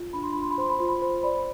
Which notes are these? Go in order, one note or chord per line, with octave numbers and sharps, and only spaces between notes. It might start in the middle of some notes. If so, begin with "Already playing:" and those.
Already playing: F4
D4 B5
C6
F4 B5
C6
B5
C5 C6
B5
F4 C6
B5
C5
D5 B5